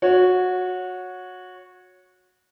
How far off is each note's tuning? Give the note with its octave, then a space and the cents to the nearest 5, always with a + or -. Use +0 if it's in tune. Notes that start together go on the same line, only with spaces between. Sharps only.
F#4 -20 C#5 +0